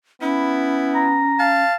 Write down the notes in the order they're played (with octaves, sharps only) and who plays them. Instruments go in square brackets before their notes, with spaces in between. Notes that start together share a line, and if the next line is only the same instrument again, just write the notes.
[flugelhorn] B3 [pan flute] C#4 [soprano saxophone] E4
[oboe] A#5
[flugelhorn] F5 [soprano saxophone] A5